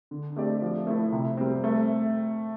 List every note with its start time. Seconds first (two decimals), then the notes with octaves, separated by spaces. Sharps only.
0.11 D3
0.36 A3 C4 G4 D5
0.62 F3
0.87 A3 E4
1.12 C3
1.37 G3 C4
1.64 A3